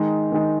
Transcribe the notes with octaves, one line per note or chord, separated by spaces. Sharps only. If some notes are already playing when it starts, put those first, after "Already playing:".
Already playing: D#3 G#3 D#4
D#3 G#3 D#4